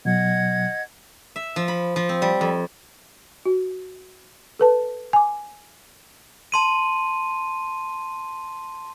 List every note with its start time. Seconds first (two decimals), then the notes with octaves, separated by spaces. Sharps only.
0.05 B2 F#3 D#5 F#5 G#6
1.36 E5
1.56 F3
1.68 B5
1.96 F3
2.09 C4
2.22 G3
2.41 F2
3.46 F#4
4.59 A4 B4 A5
5.13 G#5 D6
6.52 A5 C6 D#7